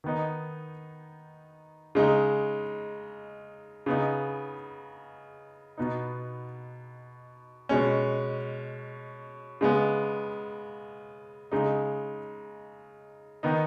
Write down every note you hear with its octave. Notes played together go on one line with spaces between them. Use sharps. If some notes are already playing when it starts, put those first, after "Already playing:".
D#3 B3 D#4
C#3 G#3 D#4
C#3 B3 D#4
B2 B3 D#4
B2 G#3 C#4
C#3 G#3 B3
C#3 G#3 D#4
D#3 B3 D#4